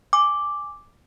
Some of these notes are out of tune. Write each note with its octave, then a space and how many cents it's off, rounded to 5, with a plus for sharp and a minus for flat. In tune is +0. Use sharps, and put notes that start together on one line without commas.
G#5 -10 D6 +0